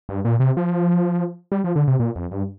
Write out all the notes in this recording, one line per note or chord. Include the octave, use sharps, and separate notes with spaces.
G2
A#2
C3
F3
G3
F3
D3
C3
A#2
F2
G2